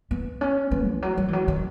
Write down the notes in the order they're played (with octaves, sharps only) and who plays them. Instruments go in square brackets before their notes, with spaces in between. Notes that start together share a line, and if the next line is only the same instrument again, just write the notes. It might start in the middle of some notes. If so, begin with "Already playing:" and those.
[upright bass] B3
C#4
B3
E3
F#3
F#3
E3
F#3
D#3